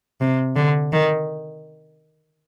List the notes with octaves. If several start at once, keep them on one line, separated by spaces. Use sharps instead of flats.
C3
D3
D#3